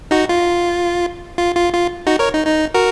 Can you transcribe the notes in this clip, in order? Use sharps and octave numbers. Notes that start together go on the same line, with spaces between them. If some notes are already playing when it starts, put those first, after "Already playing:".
D#4 F#4
F4
F4
F4
F4
D#4 F#4
A#4 C#5
D#4
D#4
F#4 A#4